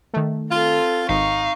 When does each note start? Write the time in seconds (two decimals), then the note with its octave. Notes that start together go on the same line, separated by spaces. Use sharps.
0.14 D#3 A3
0.51 C4 F4 A4
1.09 G#1 D#4 F5 C#6